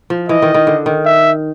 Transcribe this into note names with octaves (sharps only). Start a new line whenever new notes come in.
F3
E3 D#5
D#3
D#3
D3
D#3
E5